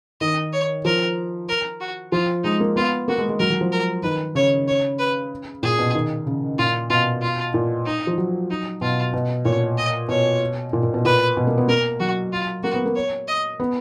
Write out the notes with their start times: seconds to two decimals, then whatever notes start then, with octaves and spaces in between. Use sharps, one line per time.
0.21 D#3 D#5
0.53 C#5
0.85 F3 A#4
1.49 A#4
1.80 F#4
2.12 F3 F4
2.44 G#3 D#4
2.60 A#3
2.76 B3 F4
3.08 A#3 F#4
3.18 G#3
3.29 G#3
3.39 F#3 A#4
3.50 F#3
3.61 F3
3.72 A#4
4.03 D#3 B4
4.35 C#3 C#5
4.68 C#5
4.99 B4
5.63 A#2 G#4
5.79 B2
5.95 D#3
6.27 C#3
6.58 A#2 F4
6.90 B2 F4
7.22 F4
7.54 A#2
7.86 D#4
8.07 F3
8.18 F#3
8.50 D#4
8.81 B2 F4
9.13 B2
9.45 A#2 C#5
9.77 D#5
10.09 B2 C#5
10.73 A#2
10.83 A#2
10.94 B2
11.05 A#2 B4
11.37 B2
11.47 A#3
11.58 B3
11.68 A#3 A#4
12.00 F#3 F#4
12.32 F4
12.63 A#3 F#4
12.74 B3
12.86 A#3
12.95 C#5
13.28 D#5
13.60 B3